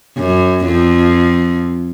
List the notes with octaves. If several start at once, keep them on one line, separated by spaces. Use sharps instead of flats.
F#2
F2